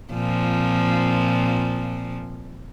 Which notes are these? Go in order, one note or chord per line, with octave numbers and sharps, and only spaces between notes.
A#2 F3 C4